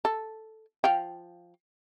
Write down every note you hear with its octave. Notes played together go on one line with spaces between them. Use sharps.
A4
F3 F5 G5